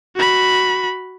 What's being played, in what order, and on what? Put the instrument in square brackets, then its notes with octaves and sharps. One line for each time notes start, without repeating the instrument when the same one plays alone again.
[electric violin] F#4 B5